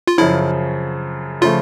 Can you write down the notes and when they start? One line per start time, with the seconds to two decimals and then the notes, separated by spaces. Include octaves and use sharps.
0.07 F4
0.18 F#2 C#3 F3 E4
1.41 C#3 F3 A3 F4